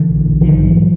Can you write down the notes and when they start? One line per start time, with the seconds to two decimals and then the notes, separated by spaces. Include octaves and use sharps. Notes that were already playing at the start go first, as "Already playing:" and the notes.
Already playing: D3 E3
0.09 A#1
0.25 A#1
0.40 A#1 D#3 F3
0.57 G#2
0.65 E3 F#3